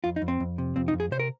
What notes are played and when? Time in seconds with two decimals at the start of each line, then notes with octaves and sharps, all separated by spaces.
0.04 F2 F4
0.16 D#4
0.22 F2
0.28 C4
0.40 F2
0.58 C3
0.76 F2 C4
0.88 D#4
0.93 F2
1.00 G#4
1.11 C3 C5
1.20 A#4